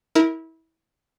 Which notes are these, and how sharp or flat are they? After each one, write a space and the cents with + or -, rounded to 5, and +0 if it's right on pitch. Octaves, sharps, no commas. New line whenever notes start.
E4 -25 A#4 +0